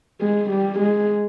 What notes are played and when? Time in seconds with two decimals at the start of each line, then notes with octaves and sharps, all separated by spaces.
0.21 G#3
0.50 G3
0.79 G#3